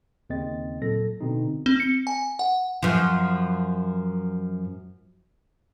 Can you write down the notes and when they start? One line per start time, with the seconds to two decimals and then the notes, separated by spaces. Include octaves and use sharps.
0.30 D#2 C#3 C4 D#5 A6
0.81 A#2 F#3 A4 A#6
1.21 B2 D3 C4 D#4
1.66 C4
1.80 C#7
2.07 G#5
2.39 F#5
2.83 F#2 F3